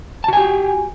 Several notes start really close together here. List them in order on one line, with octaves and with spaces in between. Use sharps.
A5 F#4 G#5 G4